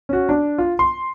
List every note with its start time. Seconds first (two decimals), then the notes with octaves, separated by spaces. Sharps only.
0.09 C#4 F#4
0.29 D4
0.58 F4
0.79 C6